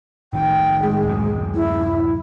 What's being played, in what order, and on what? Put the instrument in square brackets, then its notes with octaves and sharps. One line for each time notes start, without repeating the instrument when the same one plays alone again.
[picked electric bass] A2 D#3 [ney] G5
[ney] G#3
[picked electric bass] D1 F#2
[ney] E4